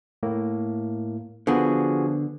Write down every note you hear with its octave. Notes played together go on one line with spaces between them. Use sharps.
A2 A#3
D3 F3 B3 F#4 G#4